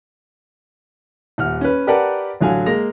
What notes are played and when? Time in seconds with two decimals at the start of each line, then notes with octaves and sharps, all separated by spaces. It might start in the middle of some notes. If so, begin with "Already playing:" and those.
1.38 D#1 F#5 F6
1.61 C#4 B4
1.87 G4 A#4 B4 D5 F#5 A5
2.41 A1 D3 F#3 F5 G#5
2.66 G#3 A#3 A#6 F7